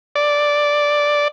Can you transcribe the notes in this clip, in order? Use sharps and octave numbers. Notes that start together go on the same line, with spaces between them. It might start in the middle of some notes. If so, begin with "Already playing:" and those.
D5